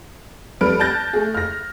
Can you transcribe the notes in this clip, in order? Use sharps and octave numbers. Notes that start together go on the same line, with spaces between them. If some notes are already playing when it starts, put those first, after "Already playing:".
F2 G3 A4 B4 F6 D7
A5 F#6 G6 A6 A#6
A3 G#4
F6 A#6